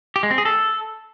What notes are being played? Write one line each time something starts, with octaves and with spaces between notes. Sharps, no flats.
G4
G#3
C4
G#4
A4